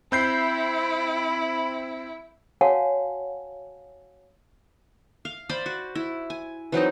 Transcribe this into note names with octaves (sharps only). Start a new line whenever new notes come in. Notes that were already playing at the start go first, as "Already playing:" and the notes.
C4 E4 B5 G6 C7
F#4 C#5 F5 F#5 G#5 A5
F5
C5 D5 B5
F#4
E4
G#5
E3 F#3 C4 D#4